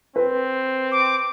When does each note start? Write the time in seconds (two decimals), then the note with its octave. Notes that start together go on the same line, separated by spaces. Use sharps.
0.16 C4 B4
0.92 D6